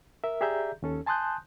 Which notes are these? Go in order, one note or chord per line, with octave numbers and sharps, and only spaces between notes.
A#4 E5
G4 G#4 D5 E5 A#5 G6
D#2 C#4 A4
G#5 A5 C6 D#6 F#6 G6